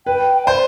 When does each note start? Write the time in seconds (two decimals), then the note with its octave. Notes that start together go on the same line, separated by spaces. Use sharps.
0.06 B4 G5
0.47 C5 D5